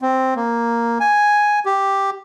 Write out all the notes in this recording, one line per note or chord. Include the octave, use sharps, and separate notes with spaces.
C4
A#3
G#5
G4